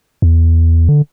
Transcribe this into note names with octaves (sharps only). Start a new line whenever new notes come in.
E2
D3